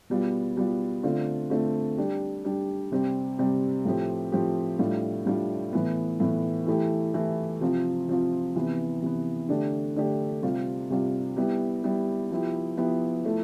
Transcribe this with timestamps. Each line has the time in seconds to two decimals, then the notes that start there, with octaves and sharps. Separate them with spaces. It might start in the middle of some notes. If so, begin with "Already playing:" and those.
0.10 B2 G3 B3 F4
0.56 B2 G3 B3 F4
1.03 D3 A3 C4 F4
1.50 D3 A3 C4 F4
1.98 G3 D4 G4
2.45 G3 D4 G4
2.92 C3 G3 C4 G4
3.38 C3 G3 C4 G4
3.85 A2 F3 C4 G4
4.32 A2 F3 C4 G4
4.79 A2 G3 D4 F4
5.26 A2 G3 D4 F4
5.73 A2 E3 B3
6.20 A2 E3 B3
6.67 E3 A3 E4 G4
7.14 E3 A3 E4 G4
7.61 C3 F3 C4 F4
8.08 C3 F3 C4 F4
8.55 C3 E3 B3
9.02 C3 E3 B3
9.49 D3 A3 D4 G4
9.96 D3 A3 D4 G4
10.43 C3 G3 C4 F4
10.90 C3 G3 C4 F4
11.36 G3 B3 E4 G4
11.84 G3 B3 E4 G4
12.31 F3 B3 E4 G4
12.77 F3 B3 E4 G4
13.25 F3 A3 E4